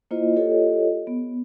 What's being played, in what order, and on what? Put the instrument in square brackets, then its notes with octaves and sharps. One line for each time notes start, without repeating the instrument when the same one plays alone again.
[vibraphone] A#3 E4 F4 C5 D#5
F4 G4 A4 C#5 D#5
B3